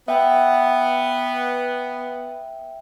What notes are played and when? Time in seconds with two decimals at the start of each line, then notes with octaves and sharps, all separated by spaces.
0.08 B3 E5 G5